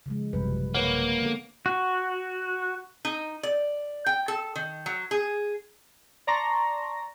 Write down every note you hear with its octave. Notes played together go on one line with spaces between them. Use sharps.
C#3 F3 G#3
A1 F#2 C3 F3 G3 B4
A#3 B4 C#5 F#5
D3 B3 A4
F#4
D#4
D5
G5
A4
D#3
F#3
G#4
D5 A5 A#5 C6 C#6 A#6